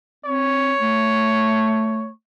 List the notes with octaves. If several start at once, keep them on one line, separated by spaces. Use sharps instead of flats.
C4 C#5
A3